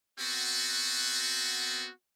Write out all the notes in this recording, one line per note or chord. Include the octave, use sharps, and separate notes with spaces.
B3 C4 F#4